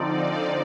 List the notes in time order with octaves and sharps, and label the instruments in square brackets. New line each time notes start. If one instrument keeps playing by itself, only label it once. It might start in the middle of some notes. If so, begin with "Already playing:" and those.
Already playing: [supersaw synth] D3 F3 C4 D#4 D5